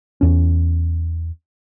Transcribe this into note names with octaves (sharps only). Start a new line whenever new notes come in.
E2 C#4